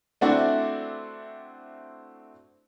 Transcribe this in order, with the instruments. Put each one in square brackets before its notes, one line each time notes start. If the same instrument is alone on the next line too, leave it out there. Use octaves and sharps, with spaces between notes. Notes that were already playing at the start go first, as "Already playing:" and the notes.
[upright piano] A3 C4 D4 E4 F#4 D5